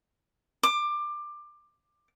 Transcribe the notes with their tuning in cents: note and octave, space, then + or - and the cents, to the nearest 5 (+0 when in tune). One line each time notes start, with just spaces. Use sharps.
D6 +20